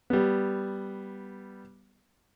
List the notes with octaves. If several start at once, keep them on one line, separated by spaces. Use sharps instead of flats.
G3 B3